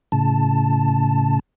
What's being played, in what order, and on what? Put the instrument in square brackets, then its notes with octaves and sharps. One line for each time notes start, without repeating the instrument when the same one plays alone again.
[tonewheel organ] A2 C#3 A5